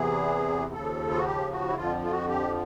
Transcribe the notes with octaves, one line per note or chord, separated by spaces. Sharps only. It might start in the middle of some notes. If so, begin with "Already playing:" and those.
Already playing: E2 C3 E3 G#4
D#2 C#3 F3 A4
F4
F#4
G4
F#4
E4
F2 D3 F3 F4
F4
F#4
G4